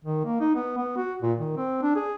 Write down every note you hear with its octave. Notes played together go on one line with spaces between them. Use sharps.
D#3
A#3
D#4
B3
B3
F#4
A#2
D#3
C4
D4
G#4